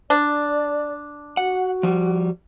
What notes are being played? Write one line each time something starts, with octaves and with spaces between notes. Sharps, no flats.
D4 D5
F#4 F#5
F3 G3